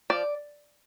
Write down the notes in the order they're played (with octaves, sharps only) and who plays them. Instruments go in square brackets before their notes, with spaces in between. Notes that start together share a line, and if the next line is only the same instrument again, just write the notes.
[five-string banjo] F3 D5